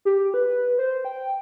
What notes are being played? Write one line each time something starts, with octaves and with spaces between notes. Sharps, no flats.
G4
B4
C5
G5